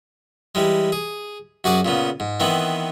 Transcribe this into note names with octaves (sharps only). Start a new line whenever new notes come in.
E3 G3 G#3
G#4
F#2 F#4 G#4 D5
A#2 C#3 B3
G#2
D#3 E3 B3 C4